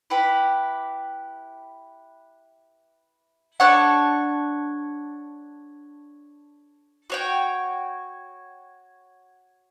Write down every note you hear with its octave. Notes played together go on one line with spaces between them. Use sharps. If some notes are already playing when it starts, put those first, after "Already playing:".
E4 G4 B4
D4 A4 C#5 F#5
F#4 C#5 G5